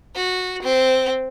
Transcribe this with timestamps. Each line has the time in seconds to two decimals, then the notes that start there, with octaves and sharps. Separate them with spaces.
0.16 F#4
0.62 C4